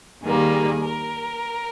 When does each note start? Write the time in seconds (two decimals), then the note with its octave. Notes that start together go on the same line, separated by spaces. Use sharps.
0.23 D#2 D#3 G3 A#3 G#4
0.83 A#4